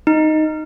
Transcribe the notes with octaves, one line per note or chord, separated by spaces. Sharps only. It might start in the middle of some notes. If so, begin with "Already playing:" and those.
D#4